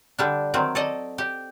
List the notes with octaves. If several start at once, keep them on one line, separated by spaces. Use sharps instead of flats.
D3 G3 D4
D#3 F#3 C4
A4 D5 D#5
G4